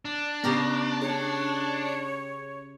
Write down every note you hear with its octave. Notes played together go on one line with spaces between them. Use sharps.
D4
C#3 B3 G4 A#4
C#4 G#4 C#5